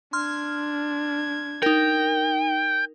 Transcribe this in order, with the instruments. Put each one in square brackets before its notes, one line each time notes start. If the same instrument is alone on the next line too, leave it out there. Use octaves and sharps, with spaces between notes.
[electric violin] D4 G#6 [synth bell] C6 F6
[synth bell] D#4 A#4 [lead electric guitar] G5